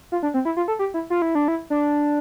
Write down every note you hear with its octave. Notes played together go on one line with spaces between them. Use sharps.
F4
D4
C4
E4
F4
A4
G4
E4
F4
E4
D4
E4
D4